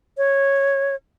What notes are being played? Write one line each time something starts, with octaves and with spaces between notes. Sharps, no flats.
C#5